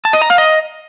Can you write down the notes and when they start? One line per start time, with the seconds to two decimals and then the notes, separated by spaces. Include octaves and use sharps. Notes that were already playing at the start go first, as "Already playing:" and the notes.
0.05 A5
0.13 D#5
0.22 A#5
0.30 F5
0.38 D#5